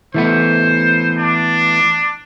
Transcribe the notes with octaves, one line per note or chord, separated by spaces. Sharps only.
E3 A3 B3 C5
D4